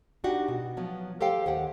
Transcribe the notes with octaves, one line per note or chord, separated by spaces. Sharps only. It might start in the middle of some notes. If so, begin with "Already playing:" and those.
D4 D#4 F#4 G4
B2
F3 F#3 B3
G4 A4 C5 F5 G5
D#2 G4 F#5